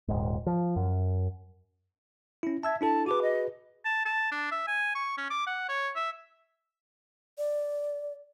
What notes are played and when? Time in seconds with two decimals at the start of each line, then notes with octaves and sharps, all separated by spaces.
0.08 D#1 G#1 G#2
0.46 F3
0.76 F#2
2.43 C#4 E4
2.63 E5 A5 E6 G#6
2.81 D4 E4 A4 A5
3.06 F#4 G#4 B4 D6
3.22 D#5
3.85 A5
4.06 A5
4.32 D4
4.52 E5
4.67 G#5
4.95 C#6
5.17 C#4
5.30 D6
5.47 F#5
5.68 C#5
5.96 E5
7.38 D5